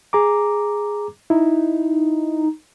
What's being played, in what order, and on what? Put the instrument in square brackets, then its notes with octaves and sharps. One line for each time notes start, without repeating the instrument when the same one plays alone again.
[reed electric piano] G#4 A#5 D6
[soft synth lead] D#4 [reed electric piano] E4